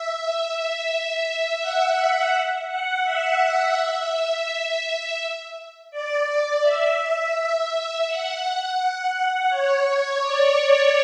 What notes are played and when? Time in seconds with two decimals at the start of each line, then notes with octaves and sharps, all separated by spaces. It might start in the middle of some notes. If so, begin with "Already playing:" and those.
Already playing: E5
0.18 E5
1.61 F#5
2.67 F#5
3.04 E5
5.91 D5
6.62 E5
8.07 F#5
9.49 C#5
10.21 D5